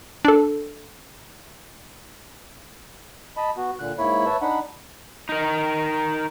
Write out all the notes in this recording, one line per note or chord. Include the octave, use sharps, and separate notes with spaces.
D4 A4
D#5 A5 B5
B3 F#4
A#2 D3 F#6
G#2 A#3 E4 C#5 B5
B4 C#5 E5 A5
D4 D#4 F#5 B5
D#4 A#4